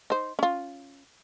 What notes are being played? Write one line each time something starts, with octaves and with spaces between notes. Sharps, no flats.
D#4 C5
C#4 F4